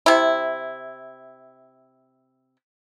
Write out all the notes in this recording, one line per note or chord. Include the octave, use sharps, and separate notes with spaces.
C3 E4